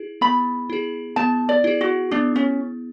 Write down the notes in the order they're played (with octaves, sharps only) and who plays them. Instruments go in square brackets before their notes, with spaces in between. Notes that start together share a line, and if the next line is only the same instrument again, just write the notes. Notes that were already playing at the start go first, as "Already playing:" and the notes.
Already playing: [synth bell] E4 G#4
[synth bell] B3 [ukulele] B5
[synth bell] E4 G#4
[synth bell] B3 [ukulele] A5
[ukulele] D5
[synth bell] E4 G#4
[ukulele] F#4
[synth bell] B3 [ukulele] D4
[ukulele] C#4